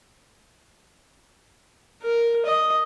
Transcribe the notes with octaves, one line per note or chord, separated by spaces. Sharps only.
A#4
D#5